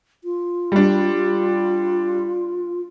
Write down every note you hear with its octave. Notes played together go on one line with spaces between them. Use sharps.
F4
G3 D4